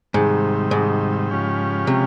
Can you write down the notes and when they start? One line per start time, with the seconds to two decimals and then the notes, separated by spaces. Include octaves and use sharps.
0.14 G#2 C3 D#3 G3
0.71 G#2
1.30 C#3 F3 G#3 C#4 G4
1.87 C3